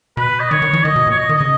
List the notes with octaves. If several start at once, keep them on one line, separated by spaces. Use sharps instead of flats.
B2 B4
D#5
D#3 C#5
D#3
E3
D#3 D#5
B2
A#2
C#5
D#5
D#3
D#5
C#3